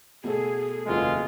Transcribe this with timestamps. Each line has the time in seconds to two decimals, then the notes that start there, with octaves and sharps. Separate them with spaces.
0.24 B2 A3 G#4 A4
0.86 F#1 E2 G#3 F4